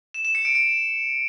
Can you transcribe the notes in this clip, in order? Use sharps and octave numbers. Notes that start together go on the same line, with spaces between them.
E7
E7
C#7
D7
D7